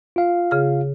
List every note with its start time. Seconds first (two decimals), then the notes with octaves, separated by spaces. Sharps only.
0.16 F4 F5
0.51 C#3 G#4 F6